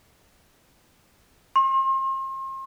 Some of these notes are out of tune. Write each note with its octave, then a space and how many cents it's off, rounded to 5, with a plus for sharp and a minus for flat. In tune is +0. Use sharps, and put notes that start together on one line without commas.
C6 +40